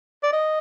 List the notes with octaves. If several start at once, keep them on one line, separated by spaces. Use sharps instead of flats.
D5
D#5